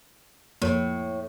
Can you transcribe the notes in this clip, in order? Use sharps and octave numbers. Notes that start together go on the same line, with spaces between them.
F2 A2 F3 A#3